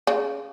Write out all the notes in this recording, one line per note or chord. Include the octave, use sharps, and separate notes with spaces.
C#3